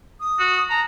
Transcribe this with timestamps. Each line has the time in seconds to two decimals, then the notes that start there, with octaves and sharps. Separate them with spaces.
0.20 D#6
0.39 F#4
0.70 A5 A#5